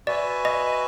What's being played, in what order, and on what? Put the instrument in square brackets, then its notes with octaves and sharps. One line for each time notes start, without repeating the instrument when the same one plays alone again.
[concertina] F#4 B4 E5 G#5 [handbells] D5
[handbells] D#5